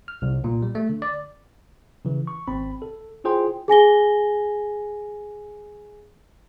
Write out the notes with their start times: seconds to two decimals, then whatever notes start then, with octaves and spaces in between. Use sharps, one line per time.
0.08 F6
0.22 C2
0.44 A#2
0.62 G3
0.75 A3
0.89 D3
1.02 D5
2.05 C#3 E3
2.27 C#6
2.48 G#1 C4 B5
2.82 A4
3.24 E4 F4 G#4 C5 G5 C6
3.68 G#4 G#5 A#6 G7